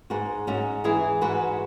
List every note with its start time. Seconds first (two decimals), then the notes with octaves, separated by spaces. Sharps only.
0.10 G#2 F#4 B4
0.47 G#2 C#4 F#4
0.84 E3 E4 G#4
1.21 G#2 F#4 B4